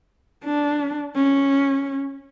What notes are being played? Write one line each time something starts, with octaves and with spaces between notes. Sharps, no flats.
D4
C#4